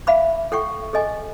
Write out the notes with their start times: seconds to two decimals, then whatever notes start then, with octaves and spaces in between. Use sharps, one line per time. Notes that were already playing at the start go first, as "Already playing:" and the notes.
0.07 E5 F5 B5 D6
0.52 A4 F#5 G5 C#6
0.93 G#4 A4 D#5 G#5